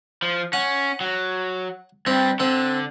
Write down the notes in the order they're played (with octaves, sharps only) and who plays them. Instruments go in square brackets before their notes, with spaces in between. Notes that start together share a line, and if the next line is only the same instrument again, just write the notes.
[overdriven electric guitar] F3
[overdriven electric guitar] C#4 [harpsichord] F#5
[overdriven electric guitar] F#3
[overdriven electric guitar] G2 G3 [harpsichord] C4
[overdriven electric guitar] D3 [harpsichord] C4